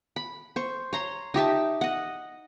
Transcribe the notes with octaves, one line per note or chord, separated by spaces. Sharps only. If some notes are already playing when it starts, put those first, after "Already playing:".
B5
C5 C#6
C#5 A#5 C6
D#4 G4 E5 A5
D#5 F#5